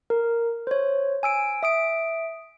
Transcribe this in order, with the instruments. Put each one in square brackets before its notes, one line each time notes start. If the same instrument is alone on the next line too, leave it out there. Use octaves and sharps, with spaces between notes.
[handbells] A#4
C5 C#5
G#5 E6 D7
E5 D#6 D7